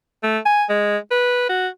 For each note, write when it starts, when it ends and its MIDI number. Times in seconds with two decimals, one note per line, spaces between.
0.23 0.38 57
0.45 0.64 80
0.69 0.97 56
1.11 1.45 71
1.49 1.68 66